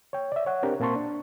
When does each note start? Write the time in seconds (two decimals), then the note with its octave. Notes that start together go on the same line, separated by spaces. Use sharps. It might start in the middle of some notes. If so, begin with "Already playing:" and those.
0.13 C#5 G5
0.32 D5 E5
0.46 C#5 F#5
0.63 C4 D4 G4 A#4
0.80 A#2 A#3 C4 A5 C6 C#6
0.96 D4